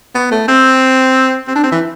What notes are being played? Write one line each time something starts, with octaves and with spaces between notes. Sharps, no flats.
B3
A3
C4
C4
D4
C4
E3